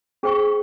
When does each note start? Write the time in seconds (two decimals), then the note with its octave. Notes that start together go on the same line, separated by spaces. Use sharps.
0.23 C#4 G#4 C5 G5 C#6